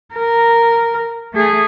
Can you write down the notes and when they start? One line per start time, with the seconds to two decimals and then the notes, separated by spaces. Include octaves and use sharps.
0.15 A#4
1.34 A3 G#4